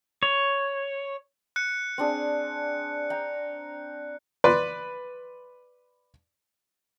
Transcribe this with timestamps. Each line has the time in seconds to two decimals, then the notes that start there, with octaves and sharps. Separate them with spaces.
0.23 C#5
1.56 F#6 C#7
1.98 C4 D4 G#4
3.10 G5 A#5
4.44 B4 D5 C6